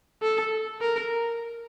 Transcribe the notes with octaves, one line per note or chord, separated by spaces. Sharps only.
A4
A#4